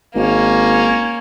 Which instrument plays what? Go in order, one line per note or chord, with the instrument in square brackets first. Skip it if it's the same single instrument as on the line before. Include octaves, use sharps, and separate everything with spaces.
[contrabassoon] G#1 [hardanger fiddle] A#3 C#4